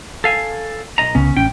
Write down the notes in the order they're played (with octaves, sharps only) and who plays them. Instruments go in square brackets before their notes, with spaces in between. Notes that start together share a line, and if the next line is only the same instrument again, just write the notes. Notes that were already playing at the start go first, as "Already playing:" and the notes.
[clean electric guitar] A4 F5 G#5
B1 D#5 A#5
[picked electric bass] C#2 C#3 B3 [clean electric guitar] C#4
[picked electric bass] A1 C#4 [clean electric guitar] G5